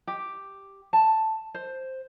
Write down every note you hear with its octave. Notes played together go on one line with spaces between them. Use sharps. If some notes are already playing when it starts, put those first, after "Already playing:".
G4
A5
C5